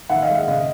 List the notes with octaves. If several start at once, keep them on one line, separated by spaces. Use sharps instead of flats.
D#3 E5 F#5
D#5 F5
G#3
D#5
C#3 D#5